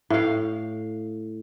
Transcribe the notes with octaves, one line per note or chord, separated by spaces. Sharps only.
A2 F5